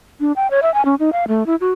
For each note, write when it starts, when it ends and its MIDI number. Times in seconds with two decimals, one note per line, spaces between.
0.20 0.32 62
0.36 0.50 79
0.51 0.60 73
0.62 0.73 76
0.74 0.85 80
0.85 0.95 61
1.00 1.13 63
1.13 1.25 77
1.28 1.46 57
1.46 1.56 64
1.61 1.72 66